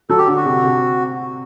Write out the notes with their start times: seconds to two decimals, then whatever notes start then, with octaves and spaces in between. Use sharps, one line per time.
0.10 F#3 A4
0.18 G4
0.28 D3
0.37 F#4
0.46 C3
0.64 C3